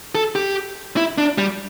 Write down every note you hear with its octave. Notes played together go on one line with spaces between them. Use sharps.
A4
G4
E4
D4
G3